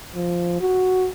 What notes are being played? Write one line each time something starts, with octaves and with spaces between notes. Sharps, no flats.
F3
F#4